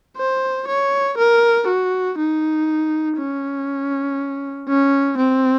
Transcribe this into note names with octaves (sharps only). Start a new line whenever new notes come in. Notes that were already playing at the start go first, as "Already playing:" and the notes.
C5
C#5
A#4
F#4
D#4
C#4
C#4
C4